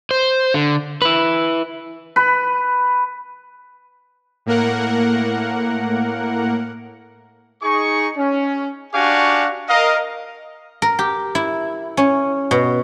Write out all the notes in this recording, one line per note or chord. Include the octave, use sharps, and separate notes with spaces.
C5
D3
E4 B4
B4
A2 A#3 A#4 F#5
D#4 G#4 C#6
C#4
D4 F#4 G4 F5 G#5 C#6
A#4 D#5 F5
A#4
G4
E4
C#4
B2